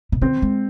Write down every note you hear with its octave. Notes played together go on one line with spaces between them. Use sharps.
C3
D3 C4
G#3